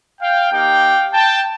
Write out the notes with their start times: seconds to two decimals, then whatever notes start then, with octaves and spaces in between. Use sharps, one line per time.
0.21 F5 G5
0.51 A#3 D#4 G4 F5 G5
1.13 G5 A5